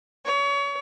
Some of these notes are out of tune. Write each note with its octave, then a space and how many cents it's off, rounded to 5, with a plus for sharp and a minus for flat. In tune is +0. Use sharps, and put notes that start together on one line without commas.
C#5 +30